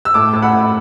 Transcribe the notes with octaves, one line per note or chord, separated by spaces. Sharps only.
E6
A2 A5 D6
A2
F#5 B5
A2